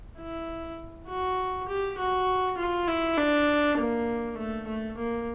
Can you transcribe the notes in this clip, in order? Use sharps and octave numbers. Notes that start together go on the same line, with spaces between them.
E4
F#4
G4
F#4
F4
E4
D4
A#3
A3
A3
A#3